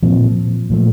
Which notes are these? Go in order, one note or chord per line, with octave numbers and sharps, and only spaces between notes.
A#2 F3 C4
A#2 F3 A3